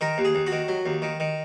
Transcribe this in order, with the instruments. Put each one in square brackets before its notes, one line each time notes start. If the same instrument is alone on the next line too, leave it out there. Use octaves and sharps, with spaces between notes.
[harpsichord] D#3 A#4
D#2
G#4
D#2
F#4
D#3
F#3
D#2
D#3
D#3